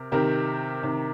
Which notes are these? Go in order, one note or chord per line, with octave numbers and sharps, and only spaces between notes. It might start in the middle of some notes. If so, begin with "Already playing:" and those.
Already playing: C3 A#4
C3 D#3 G4 A#4
C3 D#3